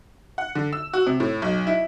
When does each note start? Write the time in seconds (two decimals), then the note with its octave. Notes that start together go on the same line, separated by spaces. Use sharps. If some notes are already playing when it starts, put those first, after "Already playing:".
0.38 F#5
0.55 D3
0.73 E6
0.93 F#4
1.07 C3
1.20 A2
1.42 B1
1.67 E4